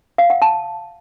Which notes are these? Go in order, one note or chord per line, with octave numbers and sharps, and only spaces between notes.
F5
F#5
A5